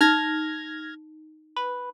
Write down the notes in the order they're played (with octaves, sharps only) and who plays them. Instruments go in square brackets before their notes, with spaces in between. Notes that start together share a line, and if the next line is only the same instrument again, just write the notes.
[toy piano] D#4 [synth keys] F6 G#6 A#6
[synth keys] B4